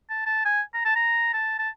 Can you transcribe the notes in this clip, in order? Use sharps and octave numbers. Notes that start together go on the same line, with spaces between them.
A5
A5
G#5
A#5
A5
A#5
A5
A5